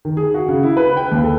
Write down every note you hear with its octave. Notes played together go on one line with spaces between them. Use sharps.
D#3
G#4
F#4
C#3
E4
B4
G5
D#2
A4